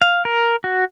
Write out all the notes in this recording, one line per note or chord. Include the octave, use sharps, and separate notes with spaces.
F5
A#4
F#4